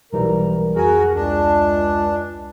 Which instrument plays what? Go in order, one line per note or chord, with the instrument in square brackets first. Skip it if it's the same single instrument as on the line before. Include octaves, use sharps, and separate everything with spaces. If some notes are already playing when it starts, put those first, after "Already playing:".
[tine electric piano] B1 E3 G3 [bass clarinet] A#4
[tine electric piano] F2 G#5 [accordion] F#4 A#4 [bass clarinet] G#4
[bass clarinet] C#2 [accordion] D4